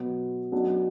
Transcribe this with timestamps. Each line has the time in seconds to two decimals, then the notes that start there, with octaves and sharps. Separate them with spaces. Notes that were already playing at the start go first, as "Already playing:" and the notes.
Already playing: B2 F#3 B3 F#4
0.52 B1 B2 F#3 D4